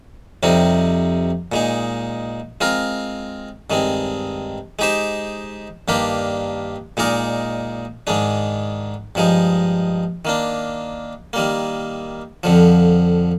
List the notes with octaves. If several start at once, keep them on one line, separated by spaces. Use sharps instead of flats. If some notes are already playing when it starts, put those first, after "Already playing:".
F2 C3 G3 C4 D#4
A#2 G#3 D#4
G#3 C4 F4 A#4
G2 D#3 G#3 C4
G#3 D#4 G4 C5
G2 D#3 A#3 D4 G4
A#2 G#3 D#4 A#4 D5
G#2 D#3 G#3 D4
G2 F3 G#3 D#4
D#3 A#3 D4
D#3 G3 A#3
F2 D3 F3